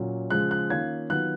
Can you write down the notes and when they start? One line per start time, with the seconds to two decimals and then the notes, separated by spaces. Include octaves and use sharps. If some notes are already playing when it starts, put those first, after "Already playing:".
Already playing: A#2 F#3 C#4
0.30 C#3 F3 G#3 F#6
0.51 F#6
0.70 D#3 A#3 C#4 F4 G#6
1.10 D#3 F#3 B3 F4 F#6